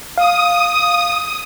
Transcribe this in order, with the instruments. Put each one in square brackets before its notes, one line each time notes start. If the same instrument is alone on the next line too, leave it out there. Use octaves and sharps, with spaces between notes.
[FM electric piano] F5 [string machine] D#6